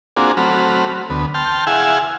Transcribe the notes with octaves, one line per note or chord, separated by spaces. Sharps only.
A#3 C4 D4 F4 F#4 G#4
F#3 A3 C4 F#4 B5 F6
D2 B3
G5 A5 C6 F6
E4 G#4 F5 F#5 G#5 E6